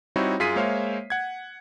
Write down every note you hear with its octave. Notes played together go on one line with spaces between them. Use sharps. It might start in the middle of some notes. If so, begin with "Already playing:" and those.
G3 C4 D#4 E4 F#4 C#5
F#2 F4 G#4 B6 C7 D#7
G#3 A#3 C5 C#5 E5 F5
F#5 G#6